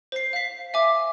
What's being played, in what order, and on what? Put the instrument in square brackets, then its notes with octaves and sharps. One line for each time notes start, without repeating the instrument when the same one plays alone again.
[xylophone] C5 C7
F5 B6
E5 G#5 D6